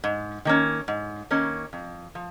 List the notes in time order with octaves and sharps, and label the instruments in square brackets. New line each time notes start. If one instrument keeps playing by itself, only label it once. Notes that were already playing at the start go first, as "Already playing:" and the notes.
[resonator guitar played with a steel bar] G#2
D#3 A#3 C#4
G#2
D#3 A#3 C#4
F2
F3